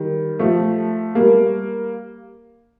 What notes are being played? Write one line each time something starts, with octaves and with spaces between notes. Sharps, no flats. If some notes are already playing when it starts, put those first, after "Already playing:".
Already playing: D#3 G3
F3 A3
G3 A#3